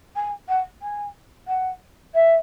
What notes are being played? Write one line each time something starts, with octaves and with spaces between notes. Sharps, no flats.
G#5
F#5
G#5
F#5
E5